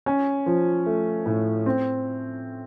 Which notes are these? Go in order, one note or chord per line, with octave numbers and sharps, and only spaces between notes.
C#4
F3
A3
A2
C4